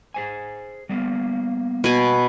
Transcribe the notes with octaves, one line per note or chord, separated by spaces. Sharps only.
G#4 C5 G#5
G3 A#3 B3
B2 G#5